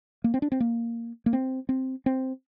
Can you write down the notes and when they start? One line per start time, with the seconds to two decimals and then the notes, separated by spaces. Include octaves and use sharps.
0.24 A#3
0.34 C4
0.42 D4
0.52 C4
0.60 A#3
1.26 A#3
1.33 C4
1.69 C4
2.06 C4